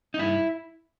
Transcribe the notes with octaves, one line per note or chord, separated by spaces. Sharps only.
D#4
G2 E4